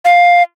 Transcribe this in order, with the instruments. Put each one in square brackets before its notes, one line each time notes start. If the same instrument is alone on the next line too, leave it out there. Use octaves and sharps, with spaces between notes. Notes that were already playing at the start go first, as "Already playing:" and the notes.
[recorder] F5